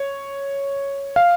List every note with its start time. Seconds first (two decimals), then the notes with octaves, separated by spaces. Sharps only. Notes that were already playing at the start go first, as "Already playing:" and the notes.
Already playing: C#5
1.16 F5